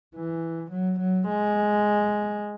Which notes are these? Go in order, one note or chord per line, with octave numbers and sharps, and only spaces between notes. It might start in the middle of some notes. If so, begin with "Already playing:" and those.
E3
F#3
F#3
G#3